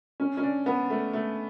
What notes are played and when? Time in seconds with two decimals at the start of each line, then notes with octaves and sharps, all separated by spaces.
0.20 C#4
0.37 C#4
0.43 D4
0.66 B3
0.90 A3
1.13 A3